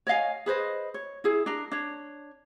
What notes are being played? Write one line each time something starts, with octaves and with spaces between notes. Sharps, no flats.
C#5 D#5 F5 G#5
G#4 B4 C5 D#5
C#5
E4 G#4
D4 A#4
D4 C#5